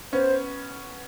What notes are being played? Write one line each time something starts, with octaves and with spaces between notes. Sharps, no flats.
B3 C#4 C5